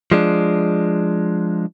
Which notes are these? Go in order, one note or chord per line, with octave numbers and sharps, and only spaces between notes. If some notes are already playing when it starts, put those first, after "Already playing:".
F3 G#3 D4